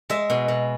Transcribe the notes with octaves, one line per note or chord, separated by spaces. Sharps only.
G#3 E5
B2
B2